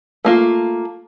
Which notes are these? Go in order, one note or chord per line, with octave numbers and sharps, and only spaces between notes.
A3 A#3 F4